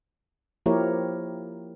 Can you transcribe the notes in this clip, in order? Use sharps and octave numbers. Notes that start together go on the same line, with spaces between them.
F3 A#3 E4 G4 A#4 C#5